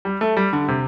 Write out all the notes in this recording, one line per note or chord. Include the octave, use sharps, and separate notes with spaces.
G3
A3
G3
D3
C3